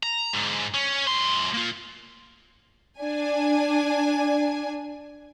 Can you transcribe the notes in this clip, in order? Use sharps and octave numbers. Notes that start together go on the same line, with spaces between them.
A#5
G#2 D3
C#4
F#2 C6
A#3 F4
D4 G#5